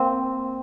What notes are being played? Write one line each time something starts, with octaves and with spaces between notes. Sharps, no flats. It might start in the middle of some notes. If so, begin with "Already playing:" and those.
Already playing: A#3 C4